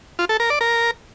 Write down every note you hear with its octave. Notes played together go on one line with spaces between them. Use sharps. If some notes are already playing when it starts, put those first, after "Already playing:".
F4
A4
A#4
D5
A#4